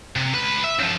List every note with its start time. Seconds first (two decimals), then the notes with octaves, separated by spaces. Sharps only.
0.16 C3
0.34 C#2 B4
0.64 E5
0.79 C#3 F3